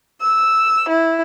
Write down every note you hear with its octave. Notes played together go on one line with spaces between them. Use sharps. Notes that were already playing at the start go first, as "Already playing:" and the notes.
E6
E4